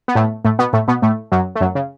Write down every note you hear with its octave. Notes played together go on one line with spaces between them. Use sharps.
B3
A2 A3
A2 A3
B2 B3
A2 A3
B2 B3
A2 A3
F#2 F#3
A3
F#2 F#3
C#3